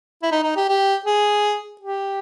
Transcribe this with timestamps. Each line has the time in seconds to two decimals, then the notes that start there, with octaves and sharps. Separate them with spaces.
0.23 E4
0.32 D#4
0.43 D#4
0.56 G4
0.69 G4
1.06 G#4
1.81 G4